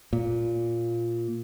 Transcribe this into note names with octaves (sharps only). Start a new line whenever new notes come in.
A#2